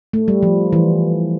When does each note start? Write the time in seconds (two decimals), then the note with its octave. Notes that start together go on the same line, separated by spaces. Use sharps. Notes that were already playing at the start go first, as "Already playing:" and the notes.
0.13 A3
0.28 G3
0.43 F3
0.73 E3